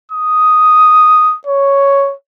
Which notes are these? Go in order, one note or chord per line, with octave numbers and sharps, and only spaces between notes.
D#6
C#5